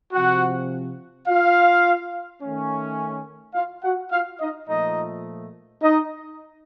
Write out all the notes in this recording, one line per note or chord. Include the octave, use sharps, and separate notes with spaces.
C3 F3 C4 F#4 F#5
F4 F5
D#3 A3 C#4
F4 F5
F#4 F#5
F4 F5
D#4 D#5
A#2 F3 A3 D#4 D#5
D#4 D#5